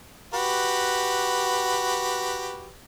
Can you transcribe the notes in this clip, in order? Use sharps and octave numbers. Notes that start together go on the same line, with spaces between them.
F#4 G4 B4